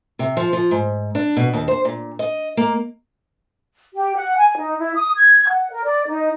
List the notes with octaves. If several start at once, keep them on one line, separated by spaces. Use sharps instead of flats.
C3
F3
F3
G#2
D4
B2
D#2
C5
A#2
D#5
A#3
G4
F#5
G#5
D#4
E4
D#6
G#6
F#5
A#4
D5
D#4